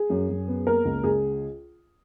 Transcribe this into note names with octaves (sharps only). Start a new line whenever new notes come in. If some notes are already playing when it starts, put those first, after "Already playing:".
Already playing: G#4
F#2
F#2
B3
A#3 A#4
C#2
C#2 G#4